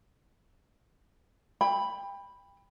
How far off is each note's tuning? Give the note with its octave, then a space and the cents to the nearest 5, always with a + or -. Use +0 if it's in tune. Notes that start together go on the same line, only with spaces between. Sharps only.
G5 +25 B5 +0